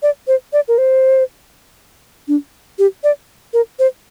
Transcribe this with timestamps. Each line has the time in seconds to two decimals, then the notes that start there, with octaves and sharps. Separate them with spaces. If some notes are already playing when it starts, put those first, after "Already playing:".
0.03 D5
0.28 C5
0.53 D5
0.68 A#4
0.78 C5
2.28 D4
2.79 G4
3.04 D5
3.54 A#4
3.79 C5